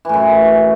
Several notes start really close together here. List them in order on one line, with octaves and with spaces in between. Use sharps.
E3 A2 F#2